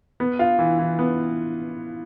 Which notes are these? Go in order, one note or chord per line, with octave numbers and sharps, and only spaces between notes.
B3
F4
E3
E3
B3